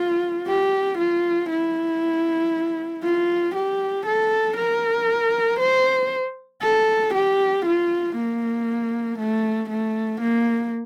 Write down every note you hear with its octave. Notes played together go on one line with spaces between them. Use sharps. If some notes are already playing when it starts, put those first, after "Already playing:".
Already playing: F4
G4
F4
E4
F4
G4
A4
A#4
C5
A4
G4
F4
A#3
A3
A3
A#3